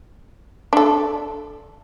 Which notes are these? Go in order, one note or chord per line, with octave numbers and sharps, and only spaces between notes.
D4 A4